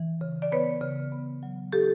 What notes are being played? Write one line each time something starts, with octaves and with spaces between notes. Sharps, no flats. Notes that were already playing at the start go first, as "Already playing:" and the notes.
Already playing: E3
C#3
D5
B3 B4 C#5
C#3
B3
F#3
D#4 G4 A4